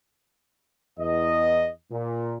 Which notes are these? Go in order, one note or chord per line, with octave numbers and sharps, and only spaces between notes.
E2 D#5
A#2